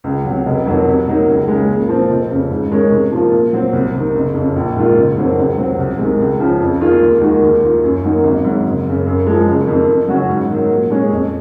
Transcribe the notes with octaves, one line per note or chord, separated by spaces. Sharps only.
C#2
C3 F#3
F1
F2 D#3 F#3
C3
F#3 A#3 D#4
C#2
C#3 G#3
A#2
F3 C4 F4
F1
F2 C#3
G#2
D#3 G#3 C#4
C3
F3 A#3 F4
A#2
F#3 C4
C2
C3 D#3
F#1
F2 C#3
A#1
G#2 D#3 A#3 F4
F#1
F2 D#3 F#3 C4
C#2
C3 F#3 C4
C2
C3 D#3 G#3
C#2
C#3 F3
F2
D#3 A#3 F4 G#4
D#2
D#3 G#3 D#4 F#4
D#2
D#3 A#3 F4
F#2
D#3 F#3 A#3 D#4
G#1
G#2 F#3
F#1
F#2 C#3
F#2
F3 G#3
F#1
F2 D#3
F2
C#3 F#3 C#4 F#4
G#2
D#3 F#3
A#2
G#3 C#4 G#4
F2